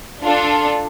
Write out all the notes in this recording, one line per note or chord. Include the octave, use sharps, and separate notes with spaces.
D4 F4 A4